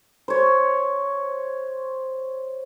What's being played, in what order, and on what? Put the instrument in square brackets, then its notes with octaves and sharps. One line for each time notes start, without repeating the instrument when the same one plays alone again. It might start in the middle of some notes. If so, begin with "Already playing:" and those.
[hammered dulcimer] C5 C#5